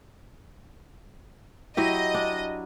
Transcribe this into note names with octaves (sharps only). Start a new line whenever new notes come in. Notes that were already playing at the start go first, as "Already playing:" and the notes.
F#3 E4 G4 D#5
D4